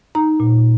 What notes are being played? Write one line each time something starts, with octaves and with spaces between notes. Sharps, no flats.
D#4 A#5
A#2